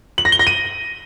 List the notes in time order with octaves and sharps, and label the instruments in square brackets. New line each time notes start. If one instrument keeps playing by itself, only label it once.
[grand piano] F#7
A#6
G7
A#6
D#7